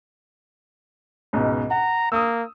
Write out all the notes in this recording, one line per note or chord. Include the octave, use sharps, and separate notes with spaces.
C#2 G#2 B2
F#5 A#5
A#3 D#6 E6